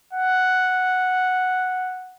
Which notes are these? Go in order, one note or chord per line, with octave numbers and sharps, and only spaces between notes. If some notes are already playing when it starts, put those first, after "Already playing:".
F#5